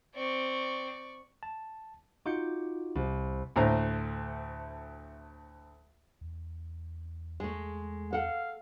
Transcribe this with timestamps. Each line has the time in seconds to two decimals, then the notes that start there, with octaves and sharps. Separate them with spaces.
0.15 C4 D5 C#6
1.43 A5
2.26 D#4 F4 F#4 D6 G6 C#7
2.95 C2
3.56 D2 A2 C5 A#5
6.21 E2
7.40 E2 G#3 A3
8.13 A4 F5 F#5